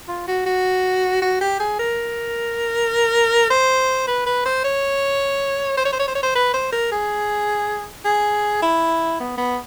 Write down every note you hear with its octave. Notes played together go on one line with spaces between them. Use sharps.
F4
F#4
F#4
F#4
G4
G#4
A#4
C5
B4
B4
C5
C#5
C5
C#5
C5
C#5
C5
C#5
C5
B4
C5
A#4
G#4
G#4
E4
B3
B3